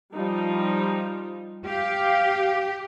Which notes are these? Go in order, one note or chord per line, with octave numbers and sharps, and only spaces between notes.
F3 G3 D#4
G4 F5